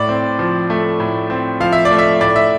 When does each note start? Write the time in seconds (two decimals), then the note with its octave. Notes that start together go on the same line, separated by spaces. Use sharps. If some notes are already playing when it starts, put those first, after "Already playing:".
Already playing: A2 D5
0.09 C4
0.39 F3
0.70 A3
1.00 A2
1.30 C4
1.60 F3 F5
1.73 E5
1.85 D5
1.91 A3
1.99 E5
2.20 A2 D5
2.36 E5